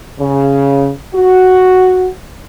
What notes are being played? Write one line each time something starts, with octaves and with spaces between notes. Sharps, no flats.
C#3
F#4